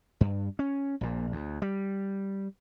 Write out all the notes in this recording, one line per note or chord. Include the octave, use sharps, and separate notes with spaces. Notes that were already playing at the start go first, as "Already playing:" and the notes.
G2
C#4
A#1 A#2
D2
G3